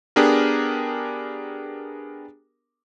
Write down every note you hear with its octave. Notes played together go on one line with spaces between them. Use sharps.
B3 D4 G4 G#4 A#4